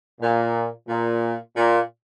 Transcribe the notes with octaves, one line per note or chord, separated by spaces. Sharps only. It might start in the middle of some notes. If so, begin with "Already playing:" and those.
A#2
A#2
A#2